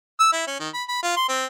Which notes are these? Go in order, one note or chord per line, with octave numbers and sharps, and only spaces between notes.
E6
E4
C#4
D#3
B5
B5
F4
C6
C4